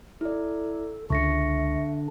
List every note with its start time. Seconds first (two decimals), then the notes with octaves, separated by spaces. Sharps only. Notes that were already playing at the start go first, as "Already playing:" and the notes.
0.21 E4 A4 D5
1.10 C#2 D3 D4 E5 C#6 A#6 C#7